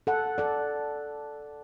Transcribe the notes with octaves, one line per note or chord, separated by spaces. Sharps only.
A4 F#5
A4 D5